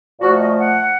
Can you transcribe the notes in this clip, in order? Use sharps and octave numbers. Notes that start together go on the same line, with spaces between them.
A#2 F3 A3 F#4
D#5
F#5